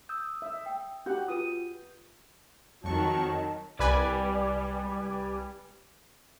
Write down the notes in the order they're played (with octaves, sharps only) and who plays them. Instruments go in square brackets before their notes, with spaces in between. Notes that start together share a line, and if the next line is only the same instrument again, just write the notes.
[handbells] D#6 E6 G6
[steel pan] E5
[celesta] G5
[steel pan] F#4 G4 F#5 [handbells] G6
[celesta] F4 B4 D#7 [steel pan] D#6
[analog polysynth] F2 C#6 [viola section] D#3 F#3 [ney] A5
[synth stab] C2 B4 G#5 [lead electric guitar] G3 D5